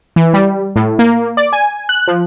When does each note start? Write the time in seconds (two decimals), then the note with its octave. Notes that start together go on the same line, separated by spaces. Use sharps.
0.16 E3
0.34 G3
0.76 A2
0.99 A#3
1.37 D5
1.53 G#5
1.89 F#6
2.08 F3